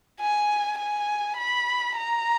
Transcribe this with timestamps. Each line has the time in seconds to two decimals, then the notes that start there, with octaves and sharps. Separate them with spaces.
0.20 G#5
0.78 G#5
1.38 B5
1.96 A#5